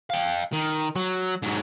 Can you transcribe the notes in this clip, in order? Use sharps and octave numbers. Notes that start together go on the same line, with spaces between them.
F5 G5
D#3
F#3
G#2 F#3